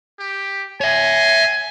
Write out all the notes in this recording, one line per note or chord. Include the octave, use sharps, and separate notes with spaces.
G4
C#5 E5 G#5